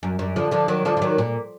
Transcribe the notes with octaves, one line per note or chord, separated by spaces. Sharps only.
F#2
F#2
D3 F3
D3 F3
D#3 F#3
D3 F3
F3
D#3 F#3
A#2